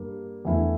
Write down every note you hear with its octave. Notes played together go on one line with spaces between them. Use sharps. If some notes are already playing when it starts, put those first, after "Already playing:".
Already playing: G2 G3 A#3
E2 D3 A3 E4